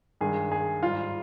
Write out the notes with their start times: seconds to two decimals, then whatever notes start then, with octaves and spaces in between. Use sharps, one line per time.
0.21 G2 D#3 G#3 G#4
0.52 G#4
0.83 G#2 G3 F4